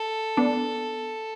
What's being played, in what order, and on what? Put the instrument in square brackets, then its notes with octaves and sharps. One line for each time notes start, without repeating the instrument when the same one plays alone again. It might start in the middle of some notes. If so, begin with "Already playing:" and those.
Already playing: [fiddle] A4
[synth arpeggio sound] B3 D4